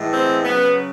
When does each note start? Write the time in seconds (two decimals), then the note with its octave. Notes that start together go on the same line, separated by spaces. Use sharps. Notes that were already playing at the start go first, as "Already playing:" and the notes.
Already playing: A2 E3 G#3
0.13 C4
0.45 C#3 F#3 B3